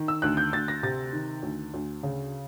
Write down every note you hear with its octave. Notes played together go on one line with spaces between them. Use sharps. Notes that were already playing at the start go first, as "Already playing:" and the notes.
Already playing: D#3
E6
D2 F#6
G6
D2 A6
A#6
C3 A6
D#3
D2
D2
C#3